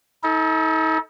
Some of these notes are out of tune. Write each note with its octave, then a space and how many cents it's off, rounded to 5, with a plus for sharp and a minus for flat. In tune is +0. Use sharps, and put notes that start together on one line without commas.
D#4 +40 A4 -10